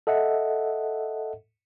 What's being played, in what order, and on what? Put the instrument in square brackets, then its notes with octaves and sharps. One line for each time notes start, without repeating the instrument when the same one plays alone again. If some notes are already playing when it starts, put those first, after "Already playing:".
[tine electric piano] A4 D#5 E5 F#5